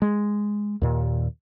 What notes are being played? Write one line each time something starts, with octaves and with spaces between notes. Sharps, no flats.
G#3
D#2 A#2